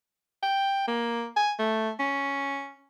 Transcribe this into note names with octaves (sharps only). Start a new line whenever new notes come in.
G5
A#3
G#5
A3
C#4